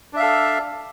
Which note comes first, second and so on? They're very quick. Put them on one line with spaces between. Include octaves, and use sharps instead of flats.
D4 E5 F5 A4